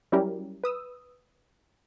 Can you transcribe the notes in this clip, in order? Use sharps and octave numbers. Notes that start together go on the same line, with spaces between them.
F#3 G3 C#4 E4 G4 A#4
B4 D#6 E6